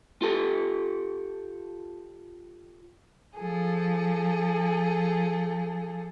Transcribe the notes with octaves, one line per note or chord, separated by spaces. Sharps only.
F4 G4 A4
F3 G#4 A4